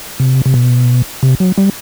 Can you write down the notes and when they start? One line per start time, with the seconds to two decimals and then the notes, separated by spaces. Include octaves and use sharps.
0.20 C3
0.46 C3
0.54 B2
1.23 C3
1.40 F#3
1.58 G3